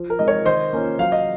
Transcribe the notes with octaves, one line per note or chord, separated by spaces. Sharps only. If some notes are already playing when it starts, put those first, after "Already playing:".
Already playing: F3
A#4
G#3 C4 D#4 D#5
A#4 C#5
D#3 C5 D#5
A#3 C#4 F4
F#3 F5
D#5